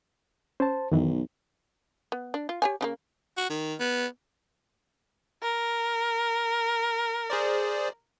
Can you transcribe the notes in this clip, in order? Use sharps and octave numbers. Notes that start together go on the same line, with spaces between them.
C#4 C5 A5
B1 F#2 D#3 E3
B3
D4
F4
G4 C#5 G#5
C#3 F3 A#3
F#4
D#3
B3
A#4
G#4 C5 D5